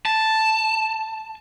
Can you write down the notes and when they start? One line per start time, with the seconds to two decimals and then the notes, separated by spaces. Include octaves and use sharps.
0.06 A5